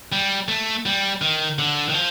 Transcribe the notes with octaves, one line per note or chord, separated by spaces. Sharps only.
G3
A3
G3
D#3
D3
D#3
F3